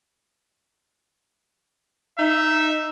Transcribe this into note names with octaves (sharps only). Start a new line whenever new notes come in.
D#4 E5